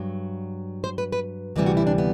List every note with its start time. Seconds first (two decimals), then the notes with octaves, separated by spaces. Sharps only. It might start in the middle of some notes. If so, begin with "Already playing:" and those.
Already playing: G2 F#3
0.84 C5
0.98 B4
1.12 B4
1.56 D2 C3 E3 G3 E4
1.66 F#4
1.77 E4
1.87 D4
1.98 B3